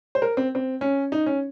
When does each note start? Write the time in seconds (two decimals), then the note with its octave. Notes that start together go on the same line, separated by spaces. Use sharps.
0.15 C5
0.22 A#4
0.37 C4
0.55 C4
0.81 C#4
1.12 D#4
1.26 C#4